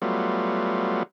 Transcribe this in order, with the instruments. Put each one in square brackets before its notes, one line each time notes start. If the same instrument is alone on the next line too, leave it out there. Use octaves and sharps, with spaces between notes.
[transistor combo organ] F#3 G3 A3 B3 F4